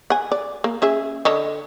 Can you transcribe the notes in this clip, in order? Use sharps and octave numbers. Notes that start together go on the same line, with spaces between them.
F#5 G#5
D5
A#3
C#4 G#4 E5
D3 C#5 D#5